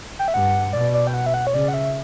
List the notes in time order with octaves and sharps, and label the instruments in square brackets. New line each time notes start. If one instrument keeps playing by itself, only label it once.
[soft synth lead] G5
E5
[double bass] G2 [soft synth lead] F#5
[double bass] B2 [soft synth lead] D5
[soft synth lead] D5
G5
F#5
E5
F#5
C#5
[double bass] C#3 [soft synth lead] D5
[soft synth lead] F#5
E5